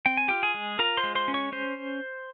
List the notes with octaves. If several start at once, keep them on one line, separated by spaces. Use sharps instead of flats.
C4 G5
G#5
F4 G4 G5
G#4 G#5
G#3
F4 A#4 A#5
C5 C6
G#3
C5 C6
C#4
C#5 C#6
C#4 C5